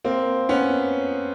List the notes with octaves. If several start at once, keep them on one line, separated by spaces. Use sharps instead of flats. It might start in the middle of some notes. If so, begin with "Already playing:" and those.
A#3 C4
B3 C#4